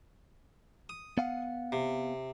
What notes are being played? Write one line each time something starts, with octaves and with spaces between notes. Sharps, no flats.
D#6
B3 F5 F#5
C3